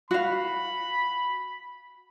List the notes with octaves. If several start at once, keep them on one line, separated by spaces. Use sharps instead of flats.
F#4 F5 B5